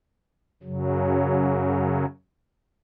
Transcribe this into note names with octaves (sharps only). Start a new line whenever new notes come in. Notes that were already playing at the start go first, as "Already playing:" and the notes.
F#2 C#3 F#3